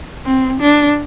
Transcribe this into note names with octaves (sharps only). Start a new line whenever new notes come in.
C4
D4